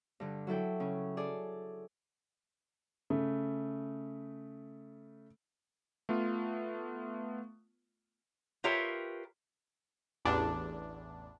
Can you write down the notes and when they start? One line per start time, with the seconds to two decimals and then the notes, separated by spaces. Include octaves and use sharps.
0.20 G2 D3
0.47 F#3 E4 A4 G5
0.80 C#3 C#4
1.17 G#4 A4 D5
3.10 C#3 A3
6.09 A3 B3 F4
8.64 F4 G4 A#4 B4 C#5 E5
10.25 A1 E2 D4